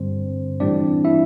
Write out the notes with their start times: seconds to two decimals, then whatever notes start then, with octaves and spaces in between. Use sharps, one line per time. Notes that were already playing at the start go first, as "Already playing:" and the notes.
Already playing: G2 D3 G3 C4 C5
0.60 A2 E3 G3 C4 D4 D5
1.05 E4 E5